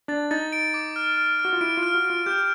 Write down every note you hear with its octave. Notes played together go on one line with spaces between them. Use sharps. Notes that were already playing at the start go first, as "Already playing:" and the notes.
D4 A6
D#4 A6
D7
D6
F6
F6
F6
F#4
F4
E4 D7
F4
F6
F#4
D7
F4
G4 G6